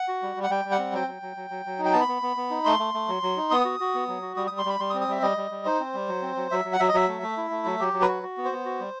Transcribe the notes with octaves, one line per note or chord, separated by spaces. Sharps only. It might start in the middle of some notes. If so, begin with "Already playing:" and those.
Already playing: F#5
F#4
G3
G3
F#5
G3 G5
G3
F#5
C4
F#3 G5
F#3
F#3
F#3
F#3
F#3
D#4
G5
B3 A5
B5
B3
B3
B3
D#4
A3 C6
A3
A3
F#3
F#3
D#4
B3 D#6
F#4
F#4
B3
F#3
F#4
G3 D#6
G3 D#6
C6
G3 B5
G3 C6
D#6
C4
D#6
G3 E5
G3 D#5
G3
G3
D#4 C5
C4
G3
F#3
C4
F#3
F#3 E5
F#3
F#5
F#3 E5
D#5
F#3 E5
A3
A3
E4
A3
F#3
F#3 G4
F#3
B4
F#4
F#4
B3
C5
B3
F#4
G3